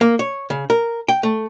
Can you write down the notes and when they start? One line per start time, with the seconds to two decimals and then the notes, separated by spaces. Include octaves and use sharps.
0.01 A#3
0.19 C#5
0.50 C#3
0.70 A#4
1.08 G5
1.23 A3